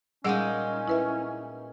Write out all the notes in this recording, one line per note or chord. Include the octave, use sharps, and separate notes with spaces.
A#2 G3 G#3 C#4 D#4 G#4 F#5
E4 B4 E5